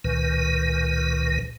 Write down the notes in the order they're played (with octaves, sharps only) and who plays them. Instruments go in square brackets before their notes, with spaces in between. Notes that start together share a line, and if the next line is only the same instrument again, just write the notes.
[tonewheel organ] C#2 A#2 D#3 B4